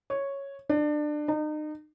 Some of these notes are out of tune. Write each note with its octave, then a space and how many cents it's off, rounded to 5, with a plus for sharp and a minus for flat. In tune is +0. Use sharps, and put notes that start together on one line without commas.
C#5 -5
D4 +25
D#4 -35